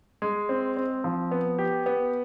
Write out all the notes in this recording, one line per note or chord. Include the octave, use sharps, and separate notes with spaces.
G#3
C4
C4
F3
B3
G4
B3